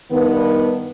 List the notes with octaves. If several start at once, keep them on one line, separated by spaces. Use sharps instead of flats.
G2 D#3 B3